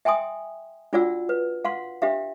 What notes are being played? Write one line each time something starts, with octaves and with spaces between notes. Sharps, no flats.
E5 G5 G#5 C6 D#6
D4 F4 F#4 D5 F#5 E6
B4
F5 F#5 C6
D4 G4 E5 F5